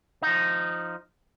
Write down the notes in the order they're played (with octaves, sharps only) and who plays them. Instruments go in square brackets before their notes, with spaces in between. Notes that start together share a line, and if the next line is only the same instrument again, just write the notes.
[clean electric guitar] F3 D#4